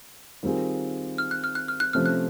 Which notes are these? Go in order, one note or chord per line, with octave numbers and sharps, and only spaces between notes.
D#3 G3 C4 F4 G#4
F6
F#6
F6
F#6
F6
F#6
C3 F3 A3 C#4 F6
F#6